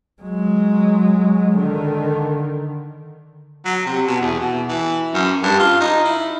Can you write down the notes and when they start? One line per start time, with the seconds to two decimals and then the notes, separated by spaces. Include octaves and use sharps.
0.22 F#3 G#3
1.55 D3 D#3
3.66 F#3
3.86 C3
4.07 B2
4.21 E2
4.40 B2
4.69 E3
5.14 F#2
5.43 G2
5.59 F4
5.80 D#4
6.05 E4